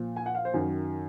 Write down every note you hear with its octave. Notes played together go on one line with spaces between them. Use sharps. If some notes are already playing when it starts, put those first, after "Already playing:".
Already playing: A#2 F3
G#5
F#5
F5
C5
F#2 D#3 F#3